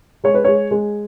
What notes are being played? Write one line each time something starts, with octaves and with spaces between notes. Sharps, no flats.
G#3 C#5
B4
G#3 C#5
G#3